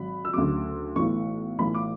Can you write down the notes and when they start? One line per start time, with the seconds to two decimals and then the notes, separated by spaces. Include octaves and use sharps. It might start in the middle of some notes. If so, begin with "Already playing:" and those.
Already playing: G#1 F#3 B5
0.25 E6
0.33 D2 C#3 F#3 D6
0.96 B1 A2 E3 C#6
1.58 B1 A2 E3 B5
1.75 D6